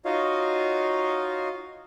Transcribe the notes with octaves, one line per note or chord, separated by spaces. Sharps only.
D#4 F4 F#4 C#5 D#5 F5